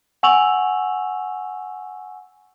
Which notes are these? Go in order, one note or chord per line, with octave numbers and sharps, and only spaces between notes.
F#5 G#5 C#6 E6 F7 F#7